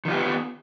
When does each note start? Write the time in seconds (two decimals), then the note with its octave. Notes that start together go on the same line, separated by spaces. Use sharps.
0.05 D#3
0.08 F4
0.11 G4
0.14 B3